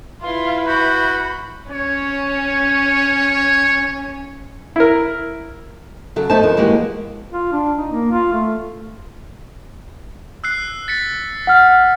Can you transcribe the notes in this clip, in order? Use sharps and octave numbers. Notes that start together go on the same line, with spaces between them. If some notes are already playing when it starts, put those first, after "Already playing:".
E4 F4 B4 C6
F#4 B5 G6
C#4 C#5
E4 A#4
C#3 F#3 A4
A3 D#4 C5 A5
F2 D#3
E3 G#3 A#3 F#4 G4
F4
D4
D#4
A#3
F4
A3
E6 F#6 C7
A6 B6 C#7
F#5 F6